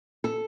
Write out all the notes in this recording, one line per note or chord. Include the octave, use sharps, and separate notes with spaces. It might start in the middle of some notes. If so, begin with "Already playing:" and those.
A4